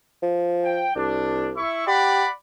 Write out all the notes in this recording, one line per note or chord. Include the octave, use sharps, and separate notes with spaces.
F3
G5
C2 D4
E4 E5 C#6
G4 D5 F#5 B5